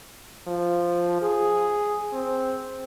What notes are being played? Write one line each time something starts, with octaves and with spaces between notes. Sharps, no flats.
F3
G#4
C4